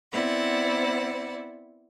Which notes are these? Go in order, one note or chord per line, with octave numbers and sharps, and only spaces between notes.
B3 C4 E4 D5 F#5